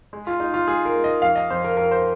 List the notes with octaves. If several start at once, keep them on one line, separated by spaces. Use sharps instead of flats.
G#3
F4
G#3 D#4
F4
G#3 G#4
A#4
G#3
D#5
F2 F5
D#5
F2 C5
A#4
F2 A#4
C5